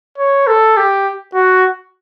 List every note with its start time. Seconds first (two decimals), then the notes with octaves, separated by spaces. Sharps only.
0.18 C#5
0.47 A4
0.77 G4
1.34 F#4